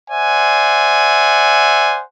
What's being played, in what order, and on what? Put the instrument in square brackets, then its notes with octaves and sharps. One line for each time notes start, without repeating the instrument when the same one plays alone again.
[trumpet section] C5 D5 E5 F#5 G#5